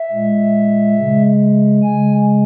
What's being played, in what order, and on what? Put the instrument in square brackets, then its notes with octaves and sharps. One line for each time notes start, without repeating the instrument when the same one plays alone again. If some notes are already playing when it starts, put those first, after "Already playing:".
Already playing: [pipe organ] E5
A#2 G#3
C#3 G#3
C#3 G#3 G#5